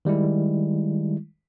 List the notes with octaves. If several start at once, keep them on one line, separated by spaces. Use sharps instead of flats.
D#3 G3 G#3 E4